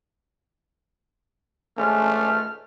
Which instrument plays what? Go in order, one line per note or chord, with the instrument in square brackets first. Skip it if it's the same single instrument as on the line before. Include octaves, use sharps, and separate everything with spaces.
[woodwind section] C#2 G#2 F6 [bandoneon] G#3 C#4 D4 [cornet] A3